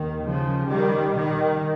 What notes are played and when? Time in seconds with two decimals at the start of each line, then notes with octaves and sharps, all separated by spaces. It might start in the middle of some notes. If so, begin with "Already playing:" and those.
Already playing: D#2 D#3
0.25 C#3 F3
0.69 D#3 G3
1.13 D#3